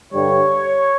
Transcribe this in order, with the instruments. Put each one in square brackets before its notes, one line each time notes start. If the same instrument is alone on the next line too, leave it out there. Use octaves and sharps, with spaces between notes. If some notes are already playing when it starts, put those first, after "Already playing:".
[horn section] G2 D3 G3 C#5